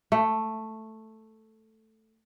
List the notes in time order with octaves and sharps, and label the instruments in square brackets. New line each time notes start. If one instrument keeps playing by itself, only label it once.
[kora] A3